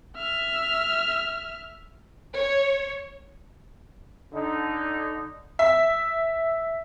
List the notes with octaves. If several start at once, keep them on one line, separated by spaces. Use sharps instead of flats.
E5 F6
C#5
D3 D#4
E5